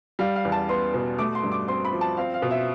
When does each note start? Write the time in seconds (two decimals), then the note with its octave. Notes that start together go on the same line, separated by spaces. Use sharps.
0.19 G3 F5
0.36 F5
0.45 E2
0.52 A5
0.69 B3 C6
0.94 B2
1.18 A3 D6
1.35 C6
1.44 G2
1.52 D6
1.68 C4 C6
1.85 B5
1.93 F3
2.01 A5
2.17 C4 F5
2.34 F5
2.42 B2
2.51 E5